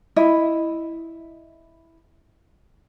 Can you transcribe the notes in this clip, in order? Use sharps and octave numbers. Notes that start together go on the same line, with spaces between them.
E4 D#5